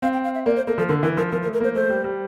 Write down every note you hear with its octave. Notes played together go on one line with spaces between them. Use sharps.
C4 F5
G5
F5
E5
A#3 D5
C5
A#3 A4
F3 A4
D3 A#4
E3 A#4
F3 A#4
F3 A#4
A#4
A3
A#4
A#3 C5
A3 C5
G3
G3